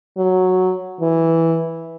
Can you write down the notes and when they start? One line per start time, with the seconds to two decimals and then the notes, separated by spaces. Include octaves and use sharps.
0.18 F#3
1.01 E3